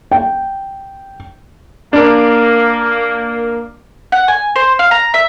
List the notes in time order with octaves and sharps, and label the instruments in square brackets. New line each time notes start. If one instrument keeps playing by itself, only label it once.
[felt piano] G5
[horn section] A#3 [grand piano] D4 A#4
[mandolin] F#5
G#5
C5
F5
A#5
E5